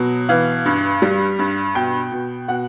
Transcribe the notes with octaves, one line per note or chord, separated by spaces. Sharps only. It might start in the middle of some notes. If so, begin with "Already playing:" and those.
Already playing: B2 F#3
E3 F5
G2
G3
G2
B2 G5
B2
B2 F#5